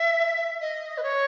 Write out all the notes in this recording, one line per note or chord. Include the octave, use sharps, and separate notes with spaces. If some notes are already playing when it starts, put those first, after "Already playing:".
Already playing: E5
D#5
B4
C#5